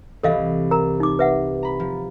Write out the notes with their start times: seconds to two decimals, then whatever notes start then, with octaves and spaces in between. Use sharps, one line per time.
0.23 C2 E3 A4 D#5 F5
0.71 A#4 A#5
1.00 D#4 D6
1.19 B4 E5 F#5
1.63 A#5 B5
1.80 F3